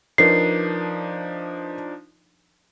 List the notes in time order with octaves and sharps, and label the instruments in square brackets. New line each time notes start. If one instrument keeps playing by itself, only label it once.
[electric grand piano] F3 D4 D#4 [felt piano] A#4 B4 [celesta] C7